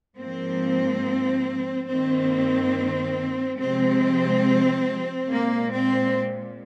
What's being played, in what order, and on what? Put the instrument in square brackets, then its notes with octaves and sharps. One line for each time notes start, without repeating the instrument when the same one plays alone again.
[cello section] G#2 F3 A#3 C4
G2 D#3 A#3 C4
C3 F3 G#3 C4
A#2 G#3 A#3
C4